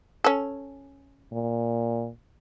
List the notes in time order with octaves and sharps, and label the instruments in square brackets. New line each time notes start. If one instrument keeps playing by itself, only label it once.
[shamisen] C#4 A4
[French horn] A#2